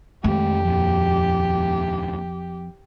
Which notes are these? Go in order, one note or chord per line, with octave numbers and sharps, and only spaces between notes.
F2 D#3 G#3 A3 G4
D#2 A#2 F3